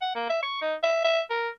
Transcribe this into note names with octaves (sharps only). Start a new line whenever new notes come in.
F#5
A#3
E5
C#6
D#4
E5
E5
A#4